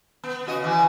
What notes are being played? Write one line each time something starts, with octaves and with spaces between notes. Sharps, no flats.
B3
C#3 F#4 D#5
E3 F#4